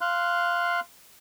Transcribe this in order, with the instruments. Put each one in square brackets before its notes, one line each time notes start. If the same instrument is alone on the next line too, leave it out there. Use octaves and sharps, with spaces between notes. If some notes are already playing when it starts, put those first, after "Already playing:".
[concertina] F5 C6 F#6